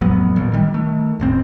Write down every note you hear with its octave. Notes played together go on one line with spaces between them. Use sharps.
A1 F2 F#3 B3
A1 A#2
D#3 G3
D#3 A3
E1 A1 C4